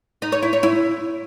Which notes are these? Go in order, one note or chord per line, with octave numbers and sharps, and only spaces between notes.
D#4
C#5
E4
C#5
E4